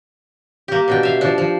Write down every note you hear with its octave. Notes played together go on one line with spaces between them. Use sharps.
A#3 G4
B2 D4 G5
E5 F5
F3 D4
F3